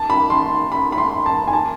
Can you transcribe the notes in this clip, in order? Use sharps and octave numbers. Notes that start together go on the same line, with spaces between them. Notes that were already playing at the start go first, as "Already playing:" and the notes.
Already playing: A5
B5
C6
B5
B5
C6
A5
G#5
A5